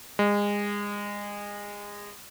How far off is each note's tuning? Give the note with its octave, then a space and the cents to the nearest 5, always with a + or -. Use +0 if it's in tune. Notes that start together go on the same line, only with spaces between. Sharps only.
G#3 -25